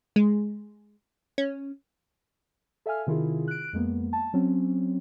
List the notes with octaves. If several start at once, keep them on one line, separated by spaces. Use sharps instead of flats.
G#3
C#4
A4 E5 F5 G#5 F6
C3 D#3 E4 F4 G#4
F#6 D7
F2 G#3 A#3 B3
A5
F#3 C4 C#4